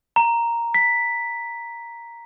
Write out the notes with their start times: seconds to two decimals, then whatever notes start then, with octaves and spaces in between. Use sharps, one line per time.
0.16 A#5
0.74 B6